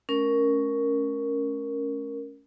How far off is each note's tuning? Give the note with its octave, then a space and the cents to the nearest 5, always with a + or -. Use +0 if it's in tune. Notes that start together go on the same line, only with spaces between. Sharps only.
A3 -30 C#4 +5 A#4 +0